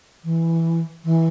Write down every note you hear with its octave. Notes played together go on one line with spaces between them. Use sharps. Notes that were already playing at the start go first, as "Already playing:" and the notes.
E3
E3